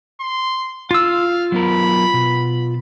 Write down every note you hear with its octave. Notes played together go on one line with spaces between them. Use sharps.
C6
F4 F5 E6
F#3 B3 A#4 B5
B2